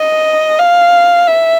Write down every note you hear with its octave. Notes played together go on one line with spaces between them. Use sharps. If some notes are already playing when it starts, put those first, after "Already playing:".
Already playing: D#5
F5
E5